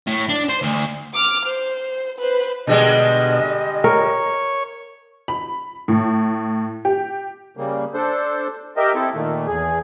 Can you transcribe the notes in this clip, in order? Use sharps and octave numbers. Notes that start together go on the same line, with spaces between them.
A2
D4
C5
D2
D6 F6
C5
B4 C5
B2 D3 G3 G#3 D#5
A#4 C#5
B5
A2
G4
C#3 G3 A#3
D4 A4 C5
G4 A#4 D#5 E5
C4 E4 A4
A#2 D#3 A3 A#3
E2 G#4